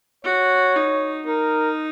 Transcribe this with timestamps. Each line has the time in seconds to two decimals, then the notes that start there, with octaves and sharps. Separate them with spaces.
0.25 F#4 C#5
0.76 D#4
1.26 D#4 A#4